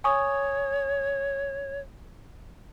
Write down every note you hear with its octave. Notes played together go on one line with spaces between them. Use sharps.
C#5 G#5 C#6 D#6